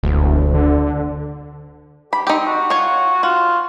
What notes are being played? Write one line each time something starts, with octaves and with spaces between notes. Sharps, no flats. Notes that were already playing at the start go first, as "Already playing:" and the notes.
E1 D2
D3
G4 B5
C4 D#4 G4
F#4
F4 C#5
F4 F#4